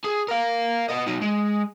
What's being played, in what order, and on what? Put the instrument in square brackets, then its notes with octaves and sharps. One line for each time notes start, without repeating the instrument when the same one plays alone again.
[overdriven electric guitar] G#4
A#4 F5
B3 D#5
F#3 D#4
G#3